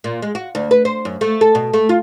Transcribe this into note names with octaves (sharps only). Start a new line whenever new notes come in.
A#2
G#3
F#4
D2
B4
C5
F#2
A3
A4
B2
A3
F4